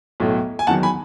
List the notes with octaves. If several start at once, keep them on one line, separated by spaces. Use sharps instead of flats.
B1 A2 F#3
G#5
E2 D#3 F#3 F#5 A5
G#5 B5